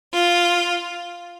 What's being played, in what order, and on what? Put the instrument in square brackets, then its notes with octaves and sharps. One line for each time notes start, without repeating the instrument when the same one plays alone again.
[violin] F4